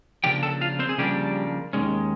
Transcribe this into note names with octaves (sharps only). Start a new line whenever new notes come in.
C#3 F3 A#3 D4 G4 G5
A4 A5
F4 F5
C4 C5
G#4
C#3 F3 G3 A#3 D4 G4
D#2 D#3 G#3 C#4